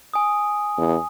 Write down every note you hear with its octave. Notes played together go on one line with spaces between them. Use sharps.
G#5 D#6
E2